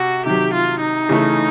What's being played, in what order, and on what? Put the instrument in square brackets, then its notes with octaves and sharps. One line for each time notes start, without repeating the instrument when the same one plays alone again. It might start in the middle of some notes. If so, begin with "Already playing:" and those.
Already playing: [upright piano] C3 [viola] F#4
[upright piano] C3 D#3 F#3 [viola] G4
[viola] F4
D#4
[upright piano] C#3 E3 A3